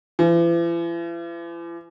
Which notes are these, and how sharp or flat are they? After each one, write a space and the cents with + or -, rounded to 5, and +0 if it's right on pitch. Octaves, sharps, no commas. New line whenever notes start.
E3 +45